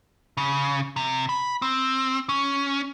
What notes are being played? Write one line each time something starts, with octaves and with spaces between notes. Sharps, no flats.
C#3
C3
B5
C4
C#4